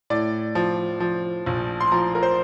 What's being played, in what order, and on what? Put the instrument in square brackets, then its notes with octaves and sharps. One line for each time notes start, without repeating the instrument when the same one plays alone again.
[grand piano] A2 D5
F3
F3
A#1
C6
F3 A#5
A#4
C5